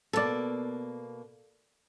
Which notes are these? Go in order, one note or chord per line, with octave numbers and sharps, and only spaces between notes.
B2 A#3 A4 D5